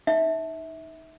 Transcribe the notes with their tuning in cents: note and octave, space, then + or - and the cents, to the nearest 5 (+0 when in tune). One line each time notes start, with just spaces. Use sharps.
D#4 -5 E5 -20